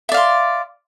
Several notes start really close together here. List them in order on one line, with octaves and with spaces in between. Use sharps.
E5 D5 F5 C6